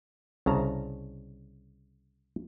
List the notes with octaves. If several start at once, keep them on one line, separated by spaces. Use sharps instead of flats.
C2 C#3 A5 A#5